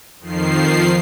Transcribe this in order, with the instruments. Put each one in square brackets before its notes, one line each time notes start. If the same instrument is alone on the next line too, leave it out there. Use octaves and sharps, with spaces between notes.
[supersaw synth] F2 D#3 F3 C7